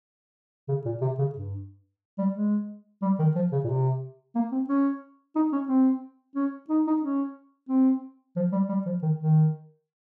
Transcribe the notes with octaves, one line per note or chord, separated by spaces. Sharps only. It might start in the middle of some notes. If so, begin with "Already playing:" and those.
C#3
A#2
C3
C#3
G2
G3
G#3
G3
D#3
F3
C#3
A#2
C3
A#3
C4
C#4
D#4
C#4
C4
C#4
D#4
D#4
C#4
C4
F3
G3
G3
F3
D#3
D#3